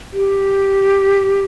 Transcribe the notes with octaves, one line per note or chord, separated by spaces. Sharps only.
G4